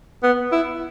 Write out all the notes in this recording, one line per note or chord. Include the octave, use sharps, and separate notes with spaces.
B3
E4